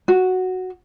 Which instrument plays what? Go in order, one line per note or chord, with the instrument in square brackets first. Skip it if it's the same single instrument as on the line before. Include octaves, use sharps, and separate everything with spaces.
[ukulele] F#4